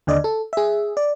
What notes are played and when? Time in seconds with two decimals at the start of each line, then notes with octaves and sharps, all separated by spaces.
0.07 D#2 D3 D5 D#5
0.24 A4
0.53 G#4 E5
0.97 D5